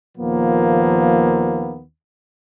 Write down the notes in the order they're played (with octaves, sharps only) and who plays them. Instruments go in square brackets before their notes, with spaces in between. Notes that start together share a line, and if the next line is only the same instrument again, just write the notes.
[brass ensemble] D#2 A#2 F3 A#3 B3